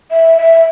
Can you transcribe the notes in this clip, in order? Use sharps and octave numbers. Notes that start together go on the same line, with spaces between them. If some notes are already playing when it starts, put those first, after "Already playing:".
E5
E5